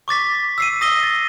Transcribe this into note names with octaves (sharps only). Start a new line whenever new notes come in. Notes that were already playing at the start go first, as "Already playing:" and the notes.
C#6 D6 A6 B6
E6 C7 D#7
D#6 A#6 D#7 G7
A6